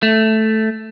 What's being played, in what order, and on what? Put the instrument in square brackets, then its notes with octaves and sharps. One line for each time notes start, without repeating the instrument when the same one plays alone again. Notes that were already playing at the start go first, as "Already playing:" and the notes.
[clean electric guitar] A3